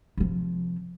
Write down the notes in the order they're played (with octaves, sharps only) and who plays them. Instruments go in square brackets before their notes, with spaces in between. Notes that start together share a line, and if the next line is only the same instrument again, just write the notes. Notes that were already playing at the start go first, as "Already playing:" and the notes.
[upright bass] C3 F3